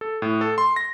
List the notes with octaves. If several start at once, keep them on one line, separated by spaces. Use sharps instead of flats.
A4
A2
A4
C6
A#6